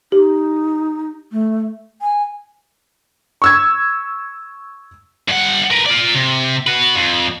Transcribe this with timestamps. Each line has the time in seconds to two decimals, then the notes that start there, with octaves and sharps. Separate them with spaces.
0.12 D#4 G4
1.32 A3
2.02 G#5
3.42 C#6 E6 G#6
5.29 G2 F#5
5.71 A#4 B4
5.86 F4 D5
6.15 C3
6.67 F#4 B4
6.96 F2